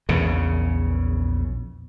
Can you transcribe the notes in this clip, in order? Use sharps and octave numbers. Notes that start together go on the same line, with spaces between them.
A#1 E2 C#3